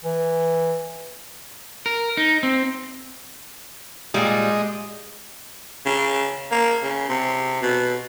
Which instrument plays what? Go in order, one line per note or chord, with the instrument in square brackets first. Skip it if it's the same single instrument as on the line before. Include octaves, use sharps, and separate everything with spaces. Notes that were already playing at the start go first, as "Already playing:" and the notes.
[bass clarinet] E3
[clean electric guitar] A#4
D#4
C4
[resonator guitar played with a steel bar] A#2 G3 [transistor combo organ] G#3 D#5
[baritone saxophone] C#3
A#3
C#3
C3
B2